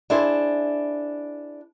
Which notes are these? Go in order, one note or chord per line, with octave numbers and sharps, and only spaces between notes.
D4 E4 G#4 C5